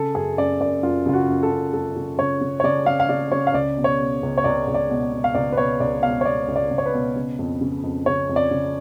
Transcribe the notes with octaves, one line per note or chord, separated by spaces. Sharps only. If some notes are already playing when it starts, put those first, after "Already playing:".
Already playing: C#3 A4
F#2 G#4
F#2 D5
F#2 D5
F#2 F4
C#3 F4
F#4
F#2
A4
F#2
F#2 A4
C#3
C#3 C#5
C#3
C#5
C#3 D5
C#3 F5
F5
C#3 D5
C#3 C#5
F5
C#2 D5
B2
C#5
B2
C#2
C#5
C#2 D5
C#2
D5
B2
B2
F5
C#2 D5
B4
B2 C#5
C#2 D5
B2 F5
C#5
B2 D5
C#2
D5
C#2
C#5
B4
B2
C#3
F2
C#3
F2
C#3 C#5
F2
D5
C#3